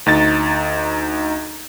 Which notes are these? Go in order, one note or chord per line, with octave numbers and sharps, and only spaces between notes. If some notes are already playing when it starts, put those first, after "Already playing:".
D2 D#4 A6